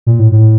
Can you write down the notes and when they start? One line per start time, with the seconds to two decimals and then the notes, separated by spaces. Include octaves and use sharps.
0.07 A#2
0.19 A2
0.32 A2